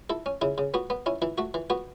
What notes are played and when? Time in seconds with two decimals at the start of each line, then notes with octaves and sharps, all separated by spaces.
0.10 E4 A4
0.26 C#4
0.41 C#3 E4
0.58 C#3
0.74 B3 F#4
0.90 B3
1.06 C#4 E4
1.22 E3 E4
1.38 A3 F#4
1.54 E3
1.70 B3 F#4